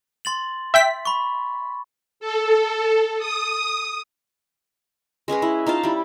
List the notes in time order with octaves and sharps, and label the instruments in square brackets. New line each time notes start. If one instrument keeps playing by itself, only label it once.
[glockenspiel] C6 A6 F#7
[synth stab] E5 G5 B6
[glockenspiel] B5 C#6
[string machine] A4
D#6
[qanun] G#3 C#4 G#4 B4
E4
D#4 F4 F5 A5
G3 E4